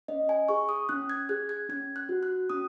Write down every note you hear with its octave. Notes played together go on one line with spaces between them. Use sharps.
C#4 D#5
G#5
G#4 C#6
D#6
C#4 F#6
G#6
G#4 F#6
G#6
C#4 G#6
F#6
F#4
F#6
C#4 D#6